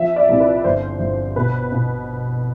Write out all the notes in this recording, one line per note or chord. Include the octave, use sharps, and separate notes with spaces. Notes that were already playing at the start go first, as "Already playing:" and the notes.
Already playing: F3 E5
D5
C2
B4
G1 C5
G1
B2 B4
B2